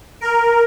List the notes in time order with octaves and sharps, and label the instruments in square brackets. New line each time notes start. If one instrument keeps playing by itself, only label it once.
[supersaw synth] A#4